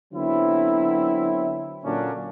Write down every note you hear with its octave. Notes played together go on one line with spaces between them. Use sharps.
D3 F#3 B3 C4 E4
A#2 D3 F#3 A#3 C#4 D4